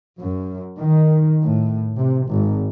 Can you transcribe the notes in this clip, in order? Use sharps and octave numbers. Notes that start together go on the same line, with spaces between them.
F#2
D#3
A2
C3
G#1